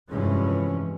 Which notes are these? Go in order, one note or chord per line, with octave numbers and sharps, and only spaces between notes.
F1 G2 E3 F3 G#3 C#4